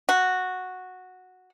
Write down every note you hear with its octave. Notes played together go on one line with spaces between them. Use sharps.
F#4